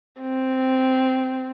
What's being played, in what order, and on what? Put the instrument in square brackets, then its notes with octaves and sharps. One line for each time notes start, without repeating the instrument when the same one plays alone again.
[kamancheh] C4